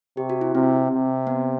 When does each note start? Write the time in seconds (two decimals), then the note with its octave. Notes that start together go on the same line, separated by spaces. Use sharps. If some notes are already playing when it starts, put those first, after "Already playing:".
0.17 C3 G4
0.30 F#4
0.41 E4
0.54 C3 C4
0.91 C3
1.27 B3